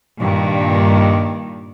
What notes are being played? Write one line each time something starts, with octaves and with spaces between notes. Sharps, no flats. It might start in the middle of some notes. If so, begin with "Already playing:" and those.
G2 A#2 D#3